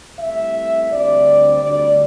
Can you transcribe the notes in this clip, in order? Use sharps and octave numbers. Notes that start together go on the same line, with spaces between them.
C2 C3 A3 E5
D2 D3 G3 C4 D5
D2 D3 G3 D5